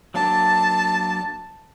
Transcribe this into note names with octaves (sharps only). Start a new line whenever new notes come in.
F#3 A#3 D4 A5